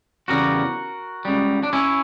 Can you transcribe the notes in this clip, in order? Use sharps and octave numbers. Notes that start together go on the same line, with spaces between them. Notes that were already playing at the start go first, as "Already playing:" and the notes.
E2 C#3 G3 F#4 A#4
C#2 C#3 G3
D4
C#4 E4